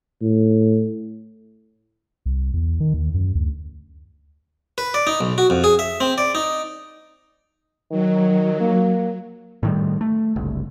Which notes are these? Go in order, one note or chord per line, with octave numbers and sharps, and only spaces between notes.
A2
C2
E2
D#3
D#2
F#2
D2
B4
D5
D#4
B1
F#4
F2
G#4
E5
C4
D5
D#4
D#3 F#3
A#3
A2 D#3 G3
A3
F#1 C2